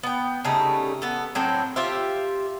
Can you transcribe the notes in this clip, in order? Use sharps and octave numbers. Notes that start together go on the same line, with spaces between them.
B3 G5
C#3 G3 A3 D#4
B3 A4
A2 F#3 C4 C5
F4 G4 C5 E5